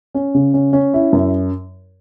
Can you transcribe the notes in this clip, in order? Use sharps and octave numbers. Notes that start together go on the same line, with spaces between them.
C#4
C#3
C#4
C#4
E4
F#2